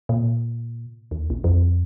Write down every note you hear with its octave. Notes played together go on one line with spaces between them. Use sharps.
A#2
D#2
A#1
F2